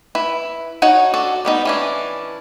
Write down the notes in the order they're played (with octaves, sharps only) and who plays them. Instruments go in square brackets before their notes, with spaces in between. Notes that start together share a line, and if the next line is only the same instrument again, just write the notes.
[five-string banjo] E4 B4
D#4 F#4 C#5 F#5
D4 F#4 A4
G3 B3 D#4
E3 C#4 D4